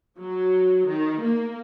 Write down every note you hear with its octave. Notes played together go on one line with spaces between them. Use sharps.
F#3
D#3
A#3